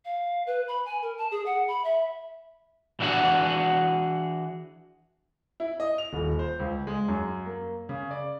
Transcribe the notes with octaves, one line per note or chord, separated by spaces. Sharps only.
F5
B4
B5
G#5
A#4
A5
G#4
F#5
B5
E5
E3 D4 F#4 G#4 F#5
E4
D#5
F7
D#1
C5
C#2
G#3
F#2
A#3
C#3
D5